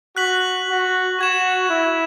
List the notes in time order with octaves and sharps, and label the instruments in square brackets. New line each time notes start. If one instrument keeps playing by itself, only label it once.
[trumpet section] F#4 [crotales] F#6 B6 F#7
[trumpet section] F#4
[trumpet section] F#4 [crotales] C#6 G#6 E7
[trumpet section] E4